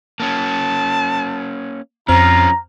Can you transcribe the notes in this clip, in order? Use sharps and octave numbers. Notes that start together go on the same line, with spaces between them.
A#3 C#4 A5
F2 F3 C4 C#4 F4 A#5 F6